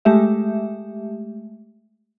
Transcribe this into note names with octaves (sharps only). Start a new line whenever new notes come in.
G#3 A3 G4 E5